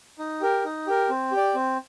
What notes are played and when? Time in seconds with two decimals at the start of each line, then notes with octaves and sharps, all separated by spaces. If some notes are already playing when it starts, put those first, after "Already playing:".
0.19 D#4
0.41 G4 A#4
0.64 D#4
0.87 G4 A#4
1.10 C4
1.32 G4
1.37 D5
1.55 C4